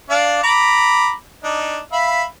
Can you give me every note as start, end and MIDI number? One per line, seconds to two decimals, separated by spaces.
0.10 0.41 62
0.10 0.41 74
0.10 0.41 77
0.43 1.11 82
0.43 1.11 83
0.43 1.11 86
1.44 1.79 62
1.44 1.79 63
1.92 2.24 76
1.92 2.24 77
1.92 2.24 83